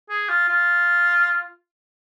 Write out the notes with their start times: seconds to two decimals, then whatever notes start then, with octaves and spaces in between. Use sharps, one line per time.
0.10 G#4
0.29 F4
0.48 F4